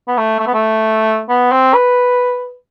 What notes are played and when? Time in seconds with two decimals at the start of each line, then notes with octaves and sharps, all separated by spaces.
0.08 B3
0.17 A3
0.39 A3
0.47 B3
0.54 A3
1.29 B3
1.52 C4
1.74 B4